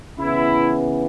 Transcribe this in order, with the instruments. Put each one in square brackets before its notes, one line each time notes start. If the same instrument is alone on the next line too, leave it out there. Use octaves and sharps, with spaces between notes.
[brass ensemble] C#3 E3 B3 E4